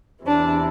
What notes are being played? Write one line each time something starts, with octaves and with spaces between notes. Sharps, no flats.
E2 C3 E3 D4